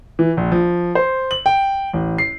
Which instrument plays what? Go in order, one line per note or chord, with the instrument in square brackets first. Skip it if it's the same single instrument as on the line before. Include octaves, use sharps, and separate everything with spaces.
[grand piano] E3
A#1
F3
C5
F#7
G5
A1
C7